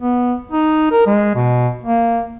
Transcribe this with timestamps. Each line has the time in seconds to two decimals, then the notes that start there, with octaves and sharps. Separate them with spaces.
0.01 B3
0.52 D#4
0.91 A#4
1.07 G#3
1.35 B2
1.84 A#3